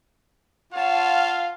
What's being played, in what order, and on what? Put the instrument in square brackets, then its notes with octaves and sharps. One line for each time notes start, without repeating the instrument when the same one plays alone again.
[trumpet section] F4 [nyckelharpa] C#5 A5 [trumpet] F5 [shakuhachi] F#5